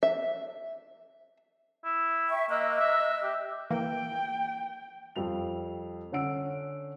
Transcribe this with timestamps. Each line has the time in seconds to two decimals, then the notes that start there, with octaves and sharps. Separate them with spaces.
0.03 E5
1.84 E4
2.29 E5 G5 C#6
2.50 A#3 D#5 E6 F#6
2.80 E5
3.23 G4
3.70 E3 A#3 G5
5.16 F2 G3 F7
6.12 D3 C#4 F#5 E6 D7